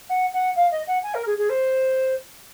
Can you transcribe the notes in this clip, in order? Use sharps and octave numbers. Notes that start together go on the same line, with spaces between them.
F#5
F#5
F5
D#5
F#5
G#5
A#4
G#4
G#4
C5